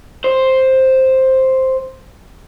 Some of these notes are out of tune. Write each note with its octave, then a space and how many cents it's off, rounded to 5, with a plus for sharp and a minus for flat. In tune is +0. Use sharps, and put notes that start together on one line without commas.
C5 +5